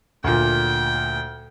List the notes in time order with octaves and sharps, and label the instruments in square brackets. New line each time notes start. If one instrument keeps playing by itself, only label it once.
[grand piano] D2 A#2 [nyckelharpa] G5